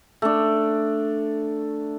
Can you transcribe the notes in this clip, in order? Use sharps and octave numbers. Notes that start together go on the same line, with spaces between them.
A3 D4